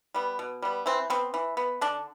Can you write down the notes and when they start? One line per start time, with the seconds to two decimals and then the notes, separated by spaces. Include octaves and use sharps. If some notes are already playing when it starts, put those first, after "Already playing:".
0.14 G3 B3
0.39 B2
0.62 G3 B3
0.86 E3 C4
1.10 B3 C4
1.34 E3
1.57 B3
1.81 D3 D4